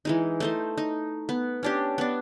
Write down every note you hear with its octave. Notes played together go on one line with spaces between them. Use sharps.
E3 G#3 D#4
A3 D#4 C5
D#4
B3
C#4 D4 G4
B3 D4